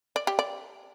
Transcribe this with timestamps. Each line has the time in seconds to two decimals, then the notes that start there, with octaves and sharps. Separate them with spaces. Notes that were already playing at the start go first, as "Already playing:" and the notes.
0.16 D5
0.27 G4
0.39 D5